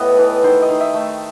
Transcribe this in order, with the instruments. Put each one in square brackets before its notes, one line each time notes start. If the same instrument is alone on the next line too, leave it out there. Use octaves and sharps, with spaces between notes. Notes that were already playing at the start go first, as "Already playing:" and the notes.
Already playing: [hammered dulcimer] A2 G3 B3 A4 D#5
E3
D#3 C5
D#5
D#3
E5
A3